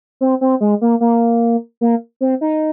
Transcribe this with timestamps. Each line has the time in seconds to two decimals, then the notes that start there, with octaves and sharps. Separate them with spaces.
0.21 C4
0.41 C4
0.61 G#3
0.81 A#3
1.00 A#3
1.81 A#3
2.21 C4
2.41 D#4